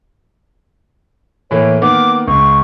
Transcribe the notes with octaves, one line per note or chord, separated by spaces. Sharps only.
A2 E3 A#3 C#5
D#3 A#3 B3 D6
C#2 C#6